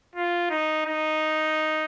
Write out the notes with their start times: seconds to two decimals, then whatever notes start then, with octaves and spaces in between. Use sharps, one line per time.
0.16 F4
0.50 D#4
0.86 D#4